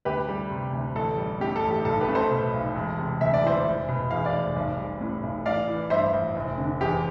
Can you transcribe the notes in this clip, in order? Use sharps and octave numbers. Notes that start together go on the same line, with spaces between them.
D2 G4 B4
G3
C3
D2
A1 A4
G3
A2 G4
A4
A1
G4
B1 A4
G4 B4
A3
A4 C5
B2
B1
E1
C3
D2 E5
D5
E3 C5 E5
F1
B2
E2 F5
D5 F5
F1
B1
G3
A2
B1
A1 D5 F5
E3
G2 C5 E5
A1
F1
D3
E2 G4